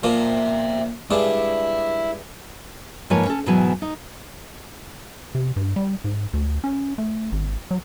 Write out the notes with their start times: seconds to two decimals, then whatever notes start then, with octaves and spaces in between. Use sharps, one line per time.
0.03 A#2 F3 A#3 C5 E5
1.11 G2 G#3 D4 E4
3.10 G#2 F3 A#3 B4 C#5 G#5
3.26 C#4 A4
3.46 G#2 B2 E3 F#3 B3 G#5
3.82 D#4
5.35 C3
5.56 G2
5.76 G3
6.04 G#2
6.33 D2
6.64 C#4
6.98 A3
7.32 G#1
7.71 F#3